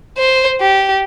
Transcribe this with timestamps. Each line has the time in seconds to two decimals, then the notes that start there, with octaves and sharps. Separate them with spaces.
0.18 C5
0.61 G4